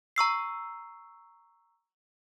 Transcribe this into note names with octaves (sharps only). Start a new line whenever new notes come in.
A#5 C#6 E6 C7